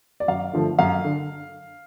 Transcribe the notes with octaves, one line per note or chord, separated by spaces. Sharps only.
D5
F#2 F5
D3 F3 A3
F#2 F5
D3